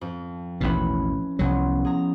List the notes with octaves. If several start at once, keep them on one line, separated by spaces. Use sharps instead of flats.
F2
A1 D#2 B2 C#4 E4 B4
C2 F3 F#3 B3 C#4
G#4 A#5